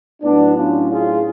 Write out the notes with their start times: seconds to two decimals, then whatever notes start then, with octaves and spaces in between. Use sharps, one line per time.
0.22 A2 F#3 B3 D4
0.56 C#4 F4
0.91 F4 G#4